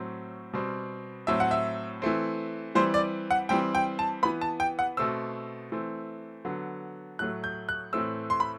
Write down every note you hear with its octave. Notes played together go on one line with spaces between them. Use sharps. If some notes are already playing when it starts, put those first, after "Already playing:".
Already playing: A2 F#3 C4
B2 G3 C4
A2 F#3 C4 E5
F#5
E5
E3 A3 C4
E3 G3 C4 C5
D5
F#5
E3 G3 C4 G5
G5
A5
E3 B3 B5
A5
G5
F#5
B2 A3 C4 E6
E3 A3 C4
D3 F#3 B3
A2 F#3 A3 F#6
G6
F#6
A2 E3 A3 C4 E6
C6
B5